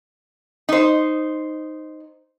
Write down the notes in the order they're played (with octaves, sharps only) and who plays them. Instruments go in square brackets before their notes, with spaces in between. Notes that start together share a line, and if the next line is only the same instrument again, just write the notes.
[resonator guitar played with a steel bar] D#4 C5